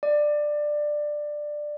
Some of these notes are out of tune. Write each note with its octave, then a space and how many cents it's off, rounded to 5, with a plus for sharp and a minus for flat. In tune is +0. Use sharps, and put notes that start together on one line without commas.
D5 +15